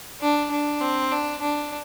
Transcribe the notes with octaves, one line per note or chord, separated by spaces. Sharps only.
D4
D4
C4
D4
D4